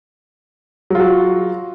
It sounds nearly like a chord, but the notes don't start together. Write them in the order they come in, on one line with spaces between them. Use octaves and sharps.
F#3 F4 F#4